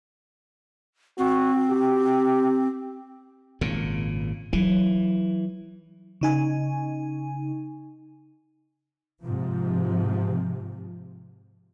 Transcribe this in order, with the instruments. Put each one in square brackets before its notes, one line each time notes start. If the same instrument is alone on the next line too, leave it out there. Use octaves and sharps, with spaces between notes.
[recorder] C4 [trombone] F#4
[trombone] G4
[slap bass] G#1 A#2 C#3
[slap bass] E3 [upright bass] F#3
[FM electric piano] C#3 D#4 G#5
[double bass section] G#2 C3 F3